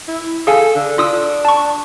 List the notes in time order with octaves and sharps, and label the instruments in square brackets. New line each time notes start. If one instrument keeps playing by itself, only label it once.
[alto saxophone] E4
[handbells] G#4 F5 G#5 [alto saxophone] A4
[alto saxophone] D3
[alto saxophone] D4 [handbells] F4 D#6 E6
[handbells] A5 C#6